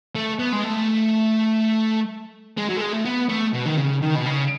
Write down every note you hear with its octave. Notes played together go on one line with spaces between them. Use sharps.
A3
B3
G#3
A3
G#3
F#3
A3
G#3
A3
B3
A3
B2
D#3
C#3
D#3
B2
C#3